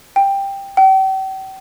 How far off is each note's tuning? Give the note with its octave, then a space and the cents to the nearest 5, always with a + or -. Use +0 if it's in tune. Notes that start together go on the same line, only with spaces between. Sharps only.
G5 +10
G5 -40